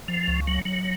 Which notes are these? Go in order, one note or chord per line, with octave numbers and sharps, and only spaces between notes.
F3
C#2
F#3
F#3